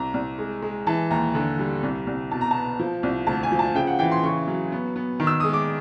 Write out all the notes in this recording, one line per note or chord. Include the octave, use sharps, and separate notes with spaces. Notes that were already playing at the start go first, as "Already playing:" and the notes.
Already playing: C2 A#5
C2
G#3
G#3
E3 A5
D#2 A#5
D3
G3
C2
C2
B2 A5
A#5
B3 A5
F3
C2
D2 A5
G#5
F3
A5
C#3 G5
F#5
E3 G5
C6
C#3 C#6
F#3
B3
B3
D#3
E6
G#3 D#6
D6